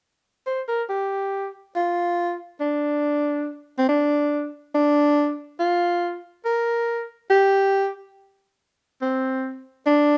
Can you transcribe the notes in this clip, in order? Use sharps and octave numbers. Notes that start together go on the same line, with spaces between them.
C5
A#4
G4
F4
D4
C4
D4
D4
F4
A#4
G4
C4
D4